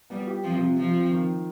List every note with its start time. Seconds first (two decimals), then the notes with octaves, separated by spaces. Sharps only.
0.10 G3 B3
0.27 G4
0.44 F3 C4
0.60 C3
0.77 F3 C4
0.94 C4
1.11 D#3